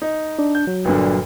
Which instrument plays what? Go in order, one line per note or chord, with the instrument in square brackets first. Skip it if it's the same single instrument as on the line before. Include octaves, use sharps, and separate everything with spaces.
[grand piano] D#4
[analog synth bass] D4
[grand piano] G6
[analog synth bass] F#3
[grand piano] G1 A#2 D3